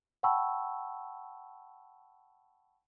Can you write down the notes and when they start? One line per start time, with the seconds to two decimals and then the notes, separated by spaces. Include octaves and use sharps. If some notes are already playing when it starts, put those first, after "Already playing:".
0.23 F#5 G5 A5 B5 C#6 E6